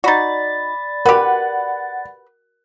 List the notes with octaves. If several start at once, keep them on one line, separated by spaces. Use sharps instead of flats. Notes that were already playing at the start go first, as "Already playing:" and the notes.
D#4 F#4 D5 B5 A6
F#4 G4 A#4 B4 F#5